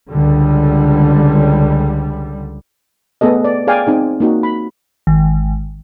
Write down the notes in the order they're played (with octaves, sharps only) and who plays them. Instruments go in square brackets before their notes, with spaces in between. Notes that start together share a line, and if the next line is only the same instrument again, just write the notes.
[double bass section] C#2 D3 G3
[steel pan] A3 B3 G#4 A4 D#5
D5
G#4 D5 F5 G5 G#5
C4 D#4 G#4
A#3 D#4 F#4
B5
[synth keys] G#1